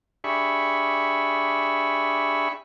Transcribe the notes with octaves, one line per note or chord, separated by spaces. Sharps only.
D4 G4 G#4 E5 B5 C#6